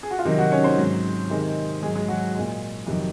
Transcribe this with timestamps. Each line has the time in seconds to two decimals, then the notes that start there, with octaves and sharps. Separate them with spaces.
0.03 G#4
0.11 F#4
0.19 F4
0.25 C3 D#3 F#3 D#4
0.39 F#3 F#4
0.52 C#4 C#5
0.64 C4 C5
0.78 G#2 F#3
1.30 C3 D#3 G#3
1.82 G#2 F#3 G#3 G#4
1.95 G#3 G#4
2.08 F#3 F#4
2.35 A#2 G#3
2.87 F2 C3 D#3 F#3